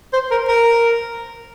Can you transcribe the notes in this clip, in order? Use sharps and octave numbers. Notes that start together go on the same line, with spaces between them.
C5
A#4
A#4